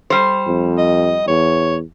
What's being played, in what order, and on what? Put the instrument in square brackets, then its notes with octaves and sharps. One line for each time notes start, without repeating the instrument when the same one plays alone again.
[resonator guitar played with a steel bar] G3 C5
[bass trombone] F2
[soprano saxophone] D#5
[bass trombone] E2 [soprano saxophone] C#5